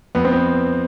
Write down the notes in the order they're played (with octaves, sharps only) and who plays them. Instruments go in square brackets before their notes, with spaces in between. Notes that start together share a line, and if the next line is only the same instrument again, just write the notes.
[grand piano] F2 B3
C4
B3